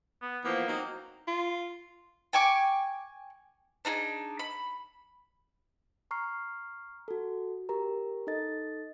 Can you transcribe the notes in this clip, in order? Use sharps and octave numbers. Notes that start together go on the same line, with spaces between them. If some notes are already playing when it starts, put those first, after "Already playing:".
B3
E3 F3 A#3 B3
F#3 C4 D#4
F4
G5 G#5 C#6 D6
D4 D#4 F4 G#4
B5
A#5 C#6 F6 C7
F#4 A4
G4 A#4 A#5
D#4 A4 D#5 A6